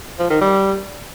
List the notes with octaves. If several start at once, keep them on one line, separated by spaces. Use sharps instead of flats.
F3
D#3
G3